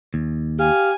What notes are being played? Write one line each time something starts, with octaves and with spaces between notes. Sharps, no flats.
D#2
G4 F5 G#5